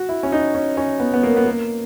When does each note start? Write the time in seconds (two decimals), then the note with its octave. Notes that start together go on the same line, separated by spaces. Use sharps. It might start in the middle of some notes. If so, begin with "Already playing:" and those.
Already playing: F#4
0.09 E4
0.23 C#4
0.32 D#4
0.55 C#4
0.77 C#4
1.00 B3
1.13 B3
1.23 A#3
1.36 B3
1.46 A#3